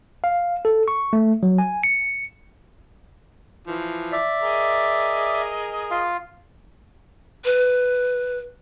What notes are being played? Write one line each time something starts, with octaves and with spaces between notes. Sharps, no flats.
F5
A4
C#6
A3
F#3
G#5
C#7
E3 F3
D5 E5
G#4 A#4 D#5
F4 F5
B4